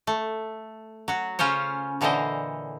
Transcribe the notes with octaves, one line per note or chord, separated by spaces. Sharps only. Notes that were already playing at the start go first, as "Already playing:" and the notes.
A3
F#3 F#4
C#3 C#4 F4 C5 C#5
A#2 D3 E3 E4 C5 D#5